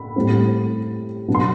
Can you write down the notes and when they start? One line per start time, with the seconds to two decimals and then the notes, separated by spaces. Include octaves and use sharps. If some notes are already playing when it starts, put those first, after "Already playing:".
Already playing: B5
0.16 A2 G3 C4
1.28 B2 F#3 B3 D4
1.35 C6